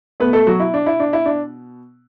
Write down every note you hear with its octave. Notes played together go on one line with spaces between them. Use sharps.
B2 A3 B3 B4
A3 A4
F#3 F#4
E4
D4
E4
D4
E4
D4